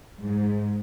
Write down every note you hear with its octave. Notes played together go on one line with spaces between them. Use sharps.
G#2